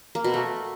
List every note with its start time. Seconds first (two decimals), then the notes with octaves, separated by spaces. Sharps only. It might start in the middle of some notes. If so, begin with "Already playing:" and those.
0.15 A#3
0.24 B2
0.34 A3